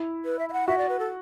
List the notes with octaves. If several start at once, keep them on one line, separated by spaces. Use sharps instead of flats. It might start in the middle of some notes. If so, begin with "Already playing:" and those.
Already playing: E4
B4
E5
E5
F#5
F#4 E5
D5
B4
A4